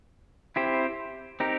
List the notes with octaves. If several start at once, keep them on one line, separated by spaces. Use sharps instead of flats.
C4 E4 G4 C5
C4 D#4 G4 A#4